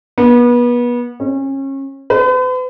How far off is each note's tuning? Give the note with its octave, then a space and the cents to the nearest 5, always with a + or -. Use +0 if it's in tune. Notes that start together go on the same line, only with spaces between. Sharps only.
B3 -30
C#4 -30
B4 +45